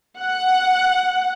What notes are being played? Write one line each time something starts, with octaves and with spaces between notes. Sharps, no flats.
F#5